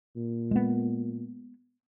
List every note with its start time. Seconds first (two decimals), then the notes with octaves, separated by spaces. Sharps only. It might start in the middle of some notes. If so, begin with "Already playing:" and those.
0.16 A#2
0.51 G#3 B3